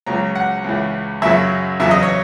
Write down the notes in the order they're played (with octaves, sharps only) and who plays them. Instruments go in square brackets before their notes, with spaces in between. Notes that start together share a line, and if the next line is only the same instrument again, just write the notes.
[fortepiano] C#2 C#3 F#3 A#5
F#5
C#2 C#3 E3
F#2 C#3 F#3 E5
E2 C#3 F#3 E5
D#5
C#5